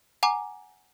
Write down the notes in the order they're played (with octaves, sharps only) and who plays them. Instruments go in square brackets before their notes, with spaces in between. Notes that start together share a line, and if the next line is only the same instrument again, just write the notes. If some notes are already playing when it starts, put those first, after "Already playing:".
[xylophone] F#5 G#5 A#5 D6